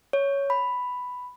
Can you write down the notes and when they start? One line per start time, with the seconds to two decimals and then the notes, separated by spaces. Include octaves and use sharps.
0.13 C#5
0.50 B5